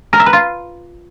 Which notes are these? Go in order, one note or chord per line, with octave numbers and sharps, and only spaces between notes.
A#4
E5
B4
F4